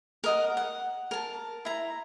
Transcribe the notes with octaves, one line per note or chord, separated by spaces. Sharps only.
A#4 D#5 F#5
F#5
A#4 A5
E4 A#5